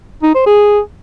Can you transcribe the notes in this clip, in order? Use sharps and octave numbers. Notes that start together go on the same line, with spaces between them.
D#4
C5
G#4